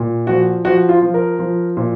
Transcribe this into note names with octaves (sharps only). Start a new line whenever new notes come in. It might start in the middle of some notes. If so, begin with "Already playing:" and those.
Already playing: A#2
F3 F#4
F3 F#4
F4
F3
A#4
F3
A#2